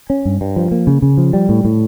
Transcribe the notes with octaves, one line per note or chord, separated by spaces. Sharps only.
C#4
G2
G2
F3
A#3
C#3
C#3
F3
G3
A2
A2